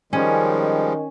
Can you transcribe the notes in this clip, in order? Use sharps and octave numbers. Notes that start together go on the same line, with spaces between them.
D#3 F3 G3 G#3 C#4